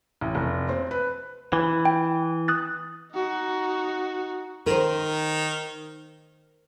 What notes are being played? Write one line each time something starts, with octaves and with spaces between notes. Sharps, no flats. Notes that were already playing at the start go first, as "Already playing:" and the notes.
A1
F1
C4
B4
E3
G5
D#6 F#6 A6
D#4 F#4
D#3 A#4 C5